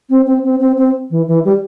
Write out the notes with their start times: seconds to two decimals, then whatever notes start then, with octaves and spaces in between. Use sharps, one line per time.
0.10 C4
0.27 C4
0.44 C4
0.60 C4
0.77 C4
1.11 E3
1.28 E3
1.45 G3